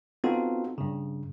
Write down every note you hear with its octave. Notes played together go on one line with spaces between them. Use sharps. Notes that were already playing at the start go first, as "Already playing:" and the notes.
B3 C4 D#4 F4 F#4 A4
G2 C#3